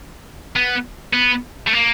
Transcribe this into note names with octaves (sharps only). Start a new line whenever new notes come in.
B3
B3
A3
A#3